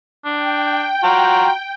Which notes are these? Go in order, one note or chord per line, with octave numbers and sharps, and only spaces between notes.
D4 G5
F4 F#4 A#5